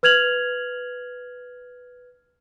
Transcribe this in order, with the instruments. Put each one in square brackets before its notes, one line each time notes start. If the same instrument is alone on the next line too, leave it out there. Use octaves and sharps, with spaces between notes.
[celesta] B4 F6 G#6 F7 F#7